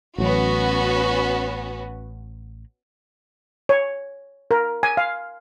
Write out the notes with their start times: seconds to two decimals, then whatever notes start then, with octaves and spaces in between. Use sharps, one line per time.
0.18 A1 F#3 B3 C#4 F#4
3.69 C#5
4.51 A#4
4.83 G#5
4.97 F5